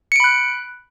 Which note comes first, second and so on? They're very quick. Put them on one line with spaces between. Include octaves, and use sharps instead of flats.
C#7 D7 B5 F#6